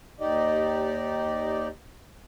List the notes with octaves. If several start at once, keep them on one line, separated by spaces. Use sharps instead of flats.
D#2 D#4 G4 D5 D#5